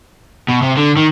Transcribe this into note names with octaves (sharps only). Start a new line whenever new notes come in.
B2
C3
D3
D#3